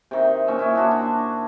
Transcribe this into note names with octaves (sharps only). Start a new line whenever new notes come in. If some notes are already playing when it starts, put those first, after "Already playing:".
C3 D#3
A#2 C#4 E5
E4 C#5 D#5
D4 F#4 C6
D4